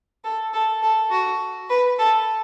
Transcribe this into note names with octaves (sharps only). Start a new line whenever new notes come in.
A4
A4
A4
F#4
B4
A4